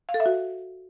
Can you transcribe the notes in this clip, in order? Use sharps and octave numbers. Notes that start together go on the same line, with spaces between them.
F5
A4
E5
F#4